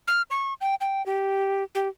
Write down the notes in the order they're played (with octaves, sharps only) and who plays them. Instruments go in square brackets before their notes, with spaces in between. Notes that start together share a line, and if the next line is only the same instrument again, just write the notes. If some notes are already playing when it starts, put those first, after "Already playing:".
[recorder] F6
C#6
G5
G5
G4
G4